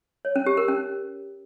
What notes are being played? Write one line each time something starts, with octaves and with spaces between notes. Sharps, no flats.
C#5
C#4
G4
A#4
C#4